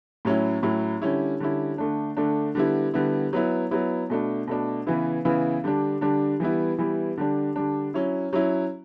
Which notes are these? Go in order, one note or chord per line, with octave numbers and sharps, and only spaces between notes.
A2 F#3 C#4 E4
A2 F#3 C#4 E4
D3 G3 C#4 E4
D3 G3 C#4 E4
D3 A3 D4
D3 A3 D4
D3 G3 B3 E4
D3 G3 B3 E4
F#3 B3 E4
F#3 B3 E4
B2 A3 D4
B2 A3 D4
C#3 E3 B3 E4
C#3 E3 B3 E4
D3 G3 D4
D3 G3 D4
E3 G3 B3 E4
E3 G3 B3 E4
D3 G3 D4
D3 G3 D4
F#3 C#4 E4
F#3 C#4 E4